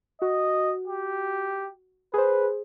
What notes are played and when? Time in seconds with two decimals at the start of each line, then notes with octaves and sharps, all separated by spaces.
0.22 F#4 D#5
0.87 G4
2.14 G#4 B4 C5